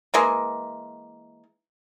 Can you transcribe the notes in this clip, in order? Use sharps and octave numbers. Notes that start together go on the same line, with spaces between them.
E3 G#3 A#3